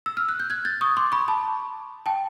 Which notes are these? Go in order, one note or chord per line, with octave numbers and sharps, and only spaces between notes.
E6
F6
F#6
G6
F#6 G#6
G6 A6
C#6 D#6
C6 D6
B5 C#6
A5 B5
G5 A5